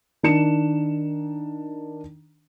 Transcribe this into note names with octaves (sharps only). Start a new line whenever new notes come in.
D#3 D4 C#7 E7